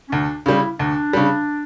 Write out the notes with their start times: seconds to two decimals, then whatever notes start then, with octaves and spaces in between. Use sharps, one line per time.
0.08 C#4
0.12 D2 D4
0.46 C#3 G3 E4
0.79 D2 D4
1.13 C#3 G3